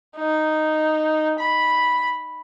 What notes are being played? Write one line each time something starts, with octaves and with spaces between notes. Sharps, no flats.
D#4
B5